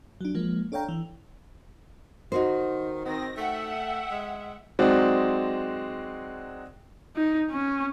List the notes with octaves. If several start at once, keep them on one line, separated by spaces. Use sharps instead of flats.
F#3 D4
F3 G#3 A#3
D4 A4 C#5 F5 G5 A#5
E3
D#3 D#4 F#4 C5
D#3 C4 A#6
A3 E5 F#5 G5
G#3
F#3 G#3 C4 D#4 F#4 D5
D#4
C#4